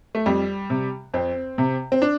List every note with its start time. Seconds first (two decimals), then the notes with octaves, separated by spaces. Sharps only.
0.15 A3
0.26 F2 G3
0.70 C3
1.14 F2 C4
1.58 C3
1.92 C4
2.02 D4